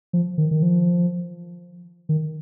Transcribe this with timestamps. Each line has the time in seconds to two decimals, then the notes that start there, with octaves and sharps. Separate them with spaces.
0.13 F3
0.38 D#3
0.51 D#3
0.62 F3
2.09 D#3